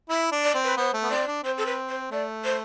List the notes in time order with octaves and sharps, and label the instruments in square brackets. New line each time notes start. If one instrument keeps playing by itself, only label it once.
[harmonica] E4 [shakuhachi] E5
[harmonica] D4
[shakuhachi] D5
[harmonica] C4
[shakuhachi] B4
[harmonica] B3 [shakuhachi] C5
[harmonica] A3
B3
[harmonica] C4 [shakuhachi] D5
[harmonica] D4
[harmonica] C4 [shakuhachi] C5
[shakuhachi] A4
B4
C5
[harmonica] A3 [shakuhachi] D5
[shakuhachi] C5